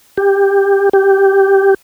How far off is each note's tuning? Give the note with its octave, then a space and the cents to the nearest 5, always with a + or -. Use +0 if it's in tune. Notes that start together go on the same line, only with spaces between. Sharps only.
G4 +15
G4 -5